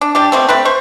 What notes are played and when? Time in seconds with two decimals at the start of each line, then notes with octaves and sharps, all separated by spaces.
0.01 D4
0.15 G3 D4 G4
0.32 B2 A3 C4
0.49 A3 C4 B4
0.65 C5 C#6